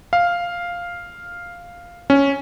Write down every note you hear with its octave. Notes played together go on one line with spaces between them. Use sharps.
F5
C#4